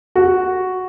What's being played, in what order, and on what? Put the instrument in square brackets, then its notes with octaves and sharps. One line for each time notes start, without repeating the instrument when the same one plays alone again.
[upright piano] F#4